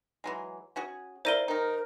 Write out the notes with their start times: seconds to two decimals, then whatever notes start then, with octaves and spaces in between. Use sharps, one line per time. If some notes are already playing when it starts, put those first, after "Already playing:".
0.24 E3 F#3 G#3
0.76 C#4 F#4 G#4
1.25 E4 A#4 C5 D5 F5 D#7 G7
1.48 D#3 D#4 A#4